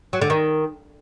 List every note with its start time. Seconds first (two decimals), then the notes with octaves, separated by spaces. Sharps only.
0.13 F#3
0.21 D3
0.30 D#3